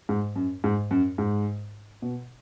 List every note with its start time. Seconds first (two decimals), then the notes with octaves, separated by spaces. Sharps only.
0.09 G#2
0.36 F#2
0.64 G#2
0.91 F#2
1.18 G#2
2.02 B2